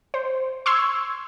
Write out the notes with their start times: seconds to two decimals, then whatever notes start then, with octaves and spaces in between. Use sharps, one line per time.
0.14 C5
0.66 C6 C#6 E6 G#6